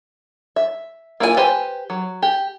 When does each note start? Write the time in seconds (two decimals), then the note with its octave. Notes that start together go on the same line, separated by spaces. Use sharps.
0.56 E5
1.20 A#3 E4 F4 G#4 G#5
1.37 G4 B4 C5 G#5
1.90 F#3
2.22 G4